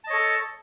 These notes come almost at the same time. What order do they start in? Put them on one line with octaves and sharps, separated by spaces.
A5 D#5 C#5 A4